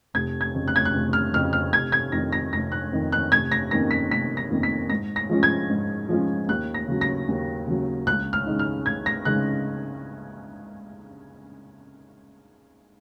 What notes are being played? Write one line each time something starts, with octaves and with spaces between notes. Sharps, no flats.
F1 G#6
G#6
F2 C#3
F#6
G#6
F#6
F1
F6
F2 C#3 F6
F6
F1 G#6
G#6
F2 D#3 A#6
A#6
F1 A#6
F#6
F2 D#3
F#6
F1 G#6
A#6
F2 D#3 A#3 C#4 A#6
B6
F1 B6
A#6
F2 D#3 A#3 C#4
B6
G#2 A#6
A#6
F3 G#3 C#4 F4
G#6
G#2
F3 G#3 C#4 F4
D#2 F#6
A#6
C#3 F#3
A#6
D#2
C#3 F#3
C#2 F#6
F6
C#3 G#3 D#4
F6
C#2 G#6
A#6
C#3 G#3 D#4 F#6